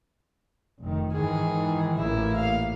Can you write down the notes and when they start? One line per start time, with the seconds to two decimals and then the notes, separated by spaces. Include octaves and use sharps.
0.81 F1 D#3
1.13 G#2 D#3 E3 G#4
1.97 A1 A#2 A#3 E4
2.36 F5